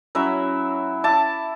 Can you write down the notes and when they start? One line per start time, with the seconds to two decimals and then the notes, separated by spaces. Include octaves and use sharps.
0.15 F#3 C#4 E4 E5
1.04 E4 A5 D6